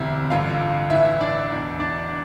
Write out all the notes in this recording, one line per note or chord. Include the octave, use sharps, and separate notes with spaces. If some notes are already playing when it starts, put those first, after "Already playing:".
Already playing: E1 D2 C3 E4
A1 G2 D3 F4 F5
A1 A2 E3 E4 E5
E4 E5
D4 D5
E1 E2 B2
D4 D5